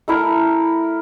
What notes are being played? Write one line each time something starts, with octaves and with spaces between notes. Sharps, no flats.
A3 E4 A#4